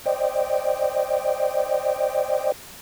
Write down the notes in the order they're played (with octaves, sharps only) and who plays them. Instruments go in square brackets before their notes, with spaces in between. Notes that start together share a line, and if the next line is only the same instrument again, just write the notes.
[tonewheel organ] C5 D5 D#5 G5